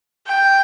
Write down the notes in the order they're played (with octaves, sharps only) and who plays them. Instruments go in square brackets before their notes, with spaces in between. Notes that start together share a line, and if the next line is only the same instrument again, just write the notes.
[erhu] G5